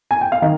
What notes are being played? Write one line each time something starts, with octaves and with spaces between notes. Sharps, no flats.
G#5
G5
F5
D#3 D#5